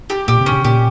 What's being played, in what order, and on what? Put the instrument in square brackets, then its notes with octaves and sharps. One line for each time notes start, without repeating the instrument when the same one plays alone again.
[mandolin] G4
[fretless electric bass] A#2 [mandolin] G4
[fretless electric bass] C3
[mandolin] C#4
[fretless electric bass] C#3
[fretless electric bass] A#2 [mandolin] G4